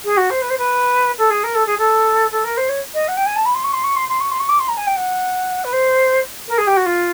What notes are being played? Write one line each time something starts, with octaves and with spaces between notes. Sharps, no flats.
G#4
F#4
C5
B4
C5
B4
A4
G#4
A#4
A4
G#4
A4
A4
A#4
C5
C#5
D#5
F#5
G5
G#5
A5
B5
C6
C#6
C6
C#6
C6
C6
C#6
C6
C#6
D6
C6
A#5
G#5
G5
F#5
B4
C5
A#4
G#4
G4
F#4
F4